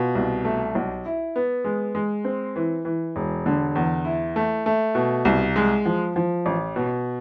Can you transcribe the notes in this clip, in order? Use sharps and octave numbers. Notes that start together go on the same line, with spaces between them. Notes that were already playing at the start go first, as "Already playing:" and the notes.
Already playing: B2 F4
C2
A3
B1
E4
B3
G#3
G#3
C4
E3
E3
E1
D3
E2
E4
A3
A3
B2
C2
G#3
F3
F3
A1
B2